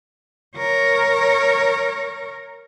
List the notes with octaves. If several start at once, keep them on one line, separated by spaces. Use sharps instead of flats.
A#4 C#5